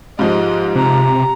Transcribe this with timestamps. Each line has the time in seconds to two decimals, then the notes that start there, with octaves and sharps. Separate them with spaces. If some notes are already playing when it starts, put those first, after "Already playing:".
0.19 G#2 F3 G#3 G4 D#5
0.76 C3 A#5